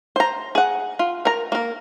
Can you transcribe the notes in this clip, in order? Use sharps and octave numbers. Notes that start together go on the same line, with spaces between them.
C5 A#5
G#4 F#5
F4
A#4 A#5
A#3 A#4